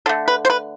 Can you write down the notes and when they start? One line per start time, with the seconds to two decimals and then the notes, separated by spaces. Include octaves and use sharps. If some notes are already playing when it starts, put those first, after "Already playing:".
0.06 D3 A4
0.09 A3
0.28 B4
0.45 C5
0.50 B4